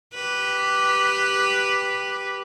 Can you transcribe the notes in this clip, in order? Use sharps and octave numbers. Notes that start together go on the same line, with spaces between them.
G4 B4